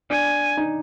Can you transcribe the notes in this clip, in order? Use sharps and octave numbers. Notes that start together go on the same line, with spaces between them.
D4 G#5
D#4